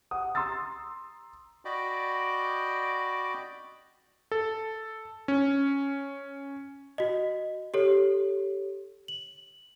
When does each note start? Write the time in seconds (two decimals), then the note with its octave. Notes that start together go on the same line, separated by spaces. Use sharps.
0.11 F#5 D#6
0.35 A#5 C6 D#6 E6 A6
1.65 F#4 D5 D#5 G5 B5 D6
4.32 A4
5.28 C#4
6.98 F#4 D#5
7.74 G4 A4 C#5
9.08 F#7